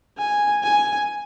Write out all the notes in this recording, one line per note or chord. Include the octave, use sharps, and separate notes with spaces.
G#5
G#5